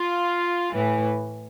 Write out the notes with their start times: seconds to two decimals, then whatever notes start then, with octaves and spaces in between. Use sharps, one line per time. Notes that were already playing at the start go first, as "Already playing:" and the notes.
Already playing: F4
0.72 A2 E3